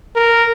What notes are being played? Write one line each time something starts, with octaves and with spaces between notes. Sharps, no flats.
A#4